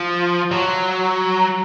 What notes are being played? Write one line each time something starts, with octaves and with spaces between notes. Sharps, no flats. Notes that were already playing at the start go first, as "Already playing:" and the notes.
Already playing: F3
F#3